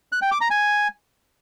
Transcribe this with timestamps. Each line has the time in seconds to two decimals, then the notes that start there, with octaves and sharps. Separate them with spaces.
0.12 F#6
0.22 G5
0.31 D6
0.41 A#5
0.51 G#5